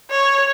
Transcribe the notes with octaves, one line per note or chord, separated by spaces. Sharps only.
C#5